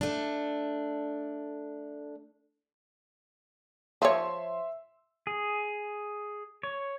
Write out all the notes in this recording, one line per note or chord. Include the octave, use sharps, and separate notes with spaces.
A3 D4
F3 C#5 E5 C6 E6
G#4
C#5